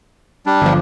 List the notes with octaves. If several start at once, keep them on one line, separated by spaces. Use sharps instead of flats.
G3 D4
G1 F3